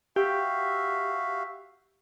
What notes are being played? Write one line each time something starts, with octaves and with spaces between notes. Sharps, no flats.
F#4 G4 E5 F5